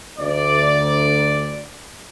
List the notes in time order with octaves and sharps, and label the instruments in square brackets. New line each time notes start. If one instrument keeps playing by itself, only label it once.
[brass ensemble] D2 D5